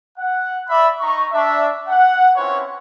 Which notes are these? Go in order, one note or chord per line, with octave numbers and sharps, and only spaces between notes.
F#5
D5 E5 B5
D#4 A#5 C#6
D4 E5
F#5
C4 C#4 E4 F4 B4 C#5